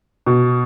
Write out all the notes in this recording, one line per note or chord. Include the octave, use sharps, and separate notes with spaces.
B2